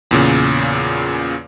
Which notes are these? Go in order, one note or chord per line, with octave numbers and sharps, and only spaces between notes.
E2 A#2 C#3